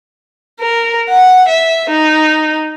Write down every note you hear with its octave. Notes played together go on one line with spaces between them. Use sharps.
A#4
F#5
E5
D#4